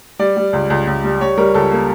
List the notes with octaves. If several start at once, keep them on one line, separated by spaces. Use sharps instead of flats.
G3 D5
G3
C#2
C#2
C#2
G3
G3 C#5
G3 A#4
C#2 A4
A#3